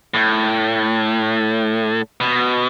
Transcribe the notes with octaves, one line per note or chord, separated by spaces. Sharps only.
A2
B2